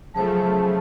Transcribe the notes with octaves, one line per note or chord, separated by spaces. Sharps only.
C#3 F3 F#3 A3 G#4 C5 A5